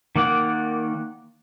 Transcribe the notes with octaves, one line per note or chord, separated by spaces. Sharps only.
D#3 A#3 D5 F#5 D6